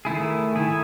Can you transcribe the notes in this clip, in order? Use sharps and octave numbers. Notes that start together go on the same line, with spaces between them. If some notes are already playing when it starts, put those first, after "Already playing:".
D#3 A3 E4 G#4
D#3 A3 E4 G#4